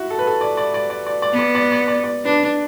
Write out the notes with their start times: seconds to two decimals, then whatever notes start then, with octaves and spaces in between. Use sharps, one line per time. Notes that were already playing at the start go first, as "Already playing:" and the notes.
Already playing: E4 F#4
0.10 A4
0.19 B4
0.27 A4
0.41 D5
0.57 D5
0.74 D5
0.90 D5
1.07 D5
1.22 D5
1.33 B3
1.39 D5
1.55 D5
1.72 D5
1.88 D5
2.04 D5
2.25 D4 B4